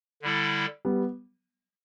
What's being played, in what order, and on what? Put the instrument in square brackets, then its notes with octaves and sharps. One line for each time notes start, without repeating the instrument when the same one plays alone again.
[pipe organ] D3 G3 E4 A4
[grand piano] G3 B3